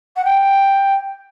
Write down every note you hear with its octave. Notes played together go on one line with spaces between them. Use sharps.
F#5
G5